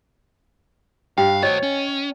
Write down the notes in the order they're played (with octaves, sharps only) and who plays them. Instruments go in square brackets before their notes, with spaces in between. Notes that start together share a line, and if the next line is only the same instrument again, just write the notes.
[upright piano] G2 [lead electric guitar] F5 [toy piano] G5
[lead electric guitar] F#4 C5 [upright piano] C#5 [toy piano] D#5
[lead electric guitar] C#4